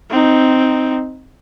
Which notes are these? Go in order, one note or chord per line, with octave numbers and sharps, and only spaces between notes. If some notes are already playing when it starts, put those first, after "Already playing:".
C4 D#4